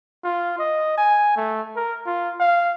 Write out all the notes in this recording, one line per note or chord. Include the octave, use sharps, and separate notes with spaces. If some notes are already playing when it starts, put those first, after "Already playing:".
F4
D#5
G#5
A3
A#4
F4
F5